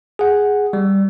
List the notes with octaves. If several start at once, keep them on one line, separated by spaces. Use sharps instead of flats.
G#4 F#5
G3